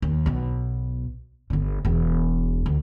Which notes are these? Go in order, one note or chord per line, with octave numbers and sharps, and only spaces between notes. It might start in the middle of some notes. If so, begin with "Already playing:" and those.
D#2
B1 B2
G1 D3
E1 E2
D2